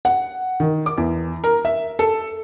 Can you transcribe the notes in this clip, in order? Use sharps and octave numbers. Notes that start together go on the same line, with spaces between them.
F#5
D#3
D6
E2
A#4
E5
A4